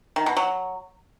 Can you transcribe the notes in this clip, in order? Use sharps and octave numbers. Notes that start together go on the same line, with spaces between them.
D#3
B2
F#3